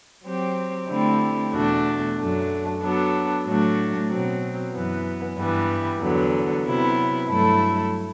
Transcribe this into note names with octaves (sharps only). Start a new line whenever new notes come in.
F#3 C4 G4
D3 A3 C4 E4 G4
E2 B2 A3 D4 F#4
F#2 F#3 A3 D4
F#3 B3 D4 A4
A2 F#3 A3 D4 F#4
B2 F#3 C4
F#2 E3 B3
G2 E3 G3 B3
E2 D3 F#3 B3
C3 F#3 B3 E4
G2 F#3 A3 E4 A4